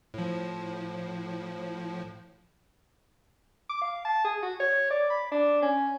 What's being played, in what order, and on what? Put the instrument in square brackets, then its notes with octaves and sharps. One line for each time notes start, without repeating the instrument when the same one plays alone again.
[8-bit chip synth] A2 F3
[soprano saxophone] D6
F5
A5
G#4
F#4
C#5
D5
B5
D4
C#4